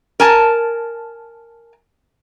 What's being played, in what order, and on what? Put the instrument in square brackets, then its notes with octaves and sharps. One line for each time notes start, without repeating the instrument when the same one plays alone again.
[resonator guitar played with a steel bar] A#4 G#5 A5